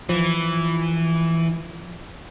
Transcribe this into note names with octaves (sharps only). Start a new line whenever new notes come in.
E3 F3